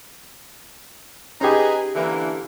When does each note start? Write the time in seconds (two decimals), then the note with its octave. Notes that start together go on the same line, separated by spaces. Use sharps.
1.41 C#4 D#4 G4 G#4 B4
1.95 D3 E3 A#3